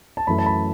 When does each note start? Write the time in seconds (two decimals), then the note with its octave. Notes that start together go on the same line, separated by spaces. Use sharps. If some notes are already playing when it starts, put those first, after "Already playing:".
0.17 A5
0.27 F#2 E3 A3 B5
0.38 A5
0.46 B5